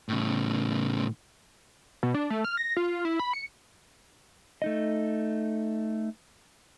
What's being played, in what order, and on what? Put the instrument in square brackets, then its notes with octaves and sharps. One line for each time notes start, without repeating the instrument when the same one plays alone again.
[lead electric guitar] A2 C#3
[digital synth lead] B2
D4
A3
F6
A#6
F4
E4
B5
C#7
[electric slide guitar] A3 D#4 D#5